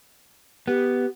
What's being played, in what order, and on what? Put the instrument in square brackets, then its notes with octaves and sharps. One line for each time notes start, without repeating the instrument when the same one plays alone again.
[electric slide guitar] B3 [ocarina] G4